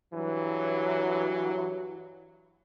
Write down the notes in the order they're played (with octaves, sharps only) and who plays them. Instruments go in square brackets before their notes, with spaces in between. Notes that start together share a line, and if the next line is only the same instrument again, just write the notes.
[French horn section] G2 F#3 [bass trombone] E3